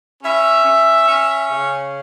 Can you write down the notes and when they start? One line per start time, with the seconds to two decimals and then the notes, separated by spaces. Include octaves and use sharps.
0.23 C#4 E5
0.65 C#4
1.08 C#4
1.49 C#3